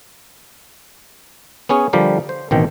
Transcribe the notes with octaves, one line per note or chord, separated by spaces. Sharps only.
B3 C#4 G#4 C#5
D3 F3 G3 G4 A#4
C5
A1 B2 D#3 C4 G5